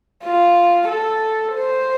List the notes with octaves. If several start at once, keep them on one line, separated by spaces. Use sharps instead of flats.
F4
A4
C5